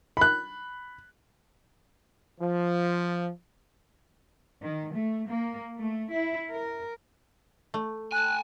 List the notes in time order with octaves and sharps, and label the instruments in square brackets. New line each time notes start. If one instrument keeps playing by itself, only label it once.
[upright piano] B5 F#6
[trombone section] F3
[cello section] D#3
A3
A#3
A3
E4
A#4
[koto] A3
[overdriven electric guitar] G#5 A5 [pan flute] F#6